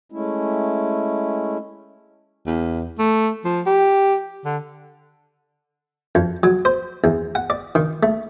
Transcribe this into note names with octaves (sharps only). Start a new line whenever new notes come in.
G#3 A3 C#4 E4
E2
A3
F3
G4
D3
F2
F#3
C5
E2
F#5
D5
D#3
A3